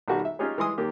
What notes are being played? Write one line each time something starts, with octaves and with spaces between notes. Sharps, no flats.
B1 D#3 G3 F#4 G4 A5
E5
C#4 D#4 F4 G4 G#4 C#5
E3 G#3 C6 D#6
D#2 A#3 G4